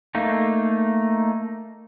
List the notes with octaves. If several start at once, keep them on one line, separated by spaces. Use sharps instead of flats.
A3 A#3 D#4